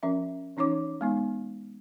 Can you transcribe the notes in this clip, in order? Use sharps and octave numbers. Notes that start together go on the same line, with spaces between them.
F3 C#4 A#4 E5
E3 C#4 D#4 C#5 D6
G#3 B3 D#4